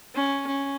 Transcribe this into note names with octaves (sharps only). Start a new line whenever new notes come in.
C#4
C#4